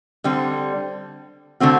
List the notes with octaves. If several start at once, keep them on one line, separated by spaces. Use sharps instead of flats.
D3 G3 C4
D3 A3 C4 F#4